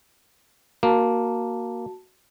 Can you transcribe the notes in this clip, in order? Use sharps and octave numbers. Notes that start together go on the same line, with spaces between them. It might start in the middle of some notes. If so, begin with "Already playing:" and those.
A#3 F#4 A5